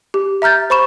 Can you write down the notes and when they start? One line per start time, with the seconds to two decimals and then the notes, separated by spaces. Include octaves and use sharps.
0.14 G4
0.42 E5 A#5 F6 G6 A6
0.70 C5 B5 C#6 E7